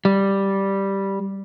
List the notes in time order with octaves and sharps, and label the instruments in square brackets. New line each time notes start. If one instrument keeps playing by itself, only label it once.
[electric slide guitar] G3